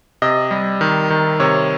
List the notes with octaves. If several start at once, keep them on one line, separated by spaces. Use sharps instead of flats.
C3 D#5
G3
D#3
D#3
C3 C#5